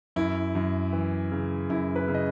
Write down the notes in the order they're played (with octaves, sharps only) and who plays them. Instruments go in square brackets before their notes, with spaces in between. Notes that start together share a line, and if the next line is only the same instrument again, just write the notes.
[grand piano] F#2 E4
F#2
E3
C#3
F#2 E4
B4
C#3
D#5